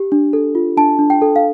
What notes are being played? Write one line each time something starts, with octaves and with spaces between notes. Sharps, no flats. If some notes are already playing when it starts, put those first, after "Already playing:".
Already playing: G4
D4
A4
F4
D4 A5
D4
G5
A4
F5